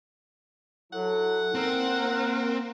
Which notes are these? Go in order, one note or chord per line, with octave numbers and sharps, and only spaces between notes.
F#3 E4 A4 F#5
A#3 C4 D#4 A#4
A#3